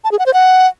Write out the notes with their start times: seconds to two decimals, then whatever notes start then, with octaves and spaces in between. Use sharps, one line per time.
0.04 A5
0.12 G#4
0.19 F#5
0.26 C5
0.34 F#5